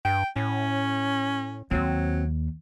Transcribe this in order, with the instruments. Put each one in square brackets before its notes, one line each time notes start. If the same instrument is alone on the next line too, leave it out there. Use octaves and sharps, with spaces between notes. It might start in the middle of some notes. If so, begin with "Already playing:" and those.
[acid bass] G2 [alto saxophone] G5
[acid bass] A2 [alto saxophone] C#4
[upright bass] D#2 [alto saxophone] F#3 [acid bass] C4